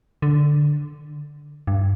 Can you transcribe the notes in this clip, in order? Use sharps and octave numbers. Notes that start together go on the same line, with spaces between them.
D3
G2